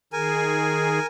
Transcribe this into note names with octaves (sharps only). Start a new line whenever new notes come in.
D#3 G#4 A#4 G#5